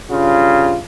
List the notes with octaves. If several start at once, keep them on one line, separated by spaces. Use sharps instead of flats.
G2 C#3 F4